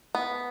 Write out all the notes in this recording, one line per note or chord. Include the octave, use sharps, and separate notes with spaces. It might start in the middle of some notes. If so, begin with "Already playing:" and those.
B3